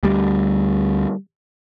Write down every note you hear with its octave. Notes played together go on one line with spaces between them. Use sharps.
D2 G3